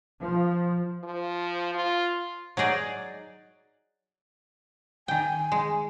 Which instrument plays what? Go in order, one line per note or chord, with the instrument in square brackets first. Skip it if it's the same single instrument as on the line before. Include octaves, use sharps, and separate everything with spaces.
[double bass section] F3
[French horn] F3
F4
[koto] F#3 D#4 G#4 D5
[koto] D#3 G5 [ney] G#5
[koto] G#3